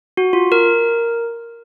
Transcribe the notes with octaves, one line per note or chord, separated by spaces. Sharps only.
F#4
F4
A#4